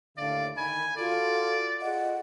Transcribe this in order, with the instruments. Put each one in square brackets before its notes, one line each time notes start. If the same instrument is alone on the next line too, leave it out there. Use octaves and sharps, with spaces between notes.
[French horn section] D#2 A2 D3 [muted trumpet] D5 [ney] F5
[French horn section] D#3 [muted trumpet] G#5 [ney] B5
[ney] F4 [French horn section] F#4 A4 [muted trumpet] D5
[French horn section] F4 G#4 D#5 [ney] F#5